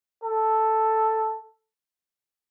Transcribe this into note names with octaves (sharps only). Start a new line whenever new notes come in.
A4